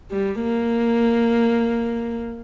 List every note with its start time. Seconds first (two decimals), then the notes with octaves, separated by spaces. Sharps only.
0.11 G3
0.44 A#3